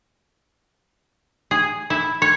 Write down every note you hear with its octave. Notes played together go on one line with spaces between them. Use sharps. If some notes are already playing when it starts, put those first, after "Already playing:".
G#4
E4
C#5